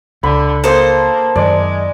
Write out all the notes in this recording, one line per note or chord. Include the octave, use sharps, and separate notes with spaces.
C#2 D3 B5
A#3 A4 A#4 C5 D#5 D#6
F#2 D#3 G#3 D5